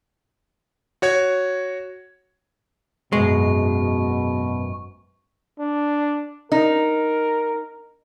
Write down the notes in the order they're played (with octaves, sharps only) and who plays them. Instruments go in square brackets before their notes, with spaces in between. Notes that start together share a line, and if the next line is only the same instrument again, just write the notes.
[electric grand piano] F#4 C#5 G#6
[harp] G#1 F#2 [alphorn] B2 [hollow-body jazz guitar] G#3 [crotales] C#6
[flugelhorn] D4
[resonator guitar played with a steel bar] D#4 [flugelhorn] A#4